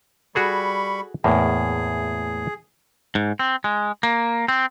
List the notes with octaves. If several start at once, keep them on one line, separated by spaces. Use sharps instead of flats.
G3 F#4 G#4 A4 B5 C#6
E2 A2 A#3 G#4
G#2
C4
G#3
A#3
C4